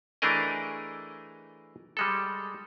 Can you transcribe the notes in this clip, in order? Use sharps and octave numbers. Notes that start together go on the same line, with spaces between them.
E3 A3 D4 G#4 A#4 D#5
G3 G#3 A4